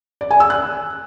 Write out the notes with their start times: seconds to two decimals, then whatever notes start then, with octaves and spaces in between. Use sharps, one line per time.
0.21 D5
0.31 G#5
0.40 E6
0.50 F#6